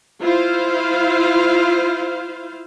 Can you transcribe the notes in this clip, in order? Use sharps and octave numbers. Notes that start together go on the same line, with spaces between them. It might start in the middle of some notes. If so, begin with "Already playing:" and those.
E4 F4 C5 F5